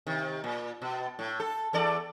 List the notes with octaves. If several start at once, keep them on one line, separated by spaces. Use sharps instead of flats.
C3 D#3
A#2
B2
A2
A4
E2 A4 D5